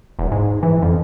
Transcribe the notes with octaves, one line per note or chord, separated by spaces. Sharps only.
E1
G#2
E3
F2